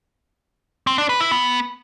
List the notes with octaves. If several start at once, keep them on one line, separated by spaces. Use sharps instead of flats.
C4
D4
B4
E4
B3